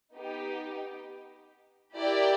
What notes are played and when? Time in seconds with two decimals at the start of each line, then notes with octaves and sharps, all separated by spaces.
0.14 B3 D#4 G4
1.95 E4 G4 A#4 D5 G5